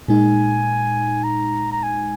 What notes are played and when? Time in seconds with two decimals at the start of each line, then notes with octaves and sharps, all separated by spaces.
0.08 A#2 G#3 D#4 G#5
1.24 A#5
1.72 A#5
1.83 G#5